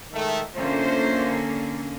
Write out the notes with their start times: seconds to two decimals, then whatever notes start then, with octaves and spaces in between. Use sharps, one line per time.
0.12 D#3 G#3 A3
0.56 D3 A3 A#3 C#4 F4 C5